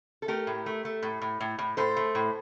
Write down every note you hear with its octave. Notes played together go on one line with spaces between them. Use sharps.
A4
A3 G4 A#4
A2
A3
A3
A2
A2
A2
A2
A2 A4 C5
A3
A2